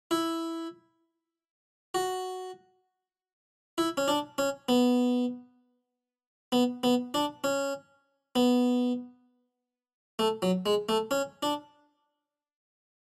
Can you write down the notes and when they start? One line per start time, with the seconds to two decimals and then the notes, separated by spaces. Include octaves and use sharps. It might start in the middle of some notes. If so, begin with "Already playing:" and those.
0.11 E4
1.95 F#4
3.78 E4
3.97 C#4
4.08 D4
4.38 C#4
4.69 B3
6.52 B3
6.83 B3
7.14 D4
7.44 C#4
8.36 B3
10.19 A3
10.42 F#3
10.66 G#3
10.89 A3
11.11 C#4
11.43 D4